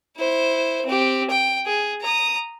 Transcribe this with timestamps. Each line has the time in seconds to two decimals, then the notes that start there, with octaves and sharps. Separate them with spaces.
0.17 E4 C5
0.86 C4 G4
1.30 G5
1.66 G#4
2.01 A#5 D#6